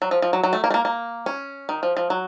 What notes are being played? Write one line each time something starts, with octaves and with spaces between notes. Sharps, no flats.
F#3
F3
F3
F#3
F#3
A3
A#3
A3
A#3
A#3
C#4
D#3
F3
F3
F#3